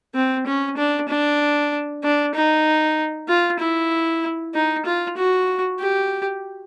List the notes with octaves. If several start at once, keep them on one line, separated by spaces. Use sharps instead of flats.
C4
C#4
D4
D4
D4
D#4
F4
E4
D#4
F4
F#4
G4